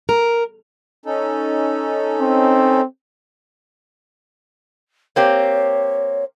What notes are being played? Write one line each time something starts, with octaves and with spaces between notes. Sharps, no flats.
A#4
C#4 D#4 A4
C4
A#3 C4 G4 C#5